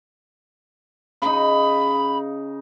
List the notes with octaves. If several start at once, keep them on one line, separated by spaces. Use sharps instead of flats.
C#3 D#4 B5